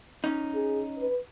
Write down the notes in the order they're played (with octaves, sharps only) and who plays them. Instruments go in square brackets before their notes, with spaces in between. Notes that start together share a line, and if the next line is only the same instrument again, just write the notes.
[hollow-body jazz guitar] C#4 D#4
[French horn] G#4
B4